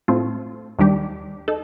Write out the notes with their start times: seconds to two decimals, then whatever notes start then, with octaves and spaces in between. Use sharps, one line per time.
0.08 A2 A3 C4 F4
0.78 D#2 D#3 G3 D4 G4
1.48 D#4 A4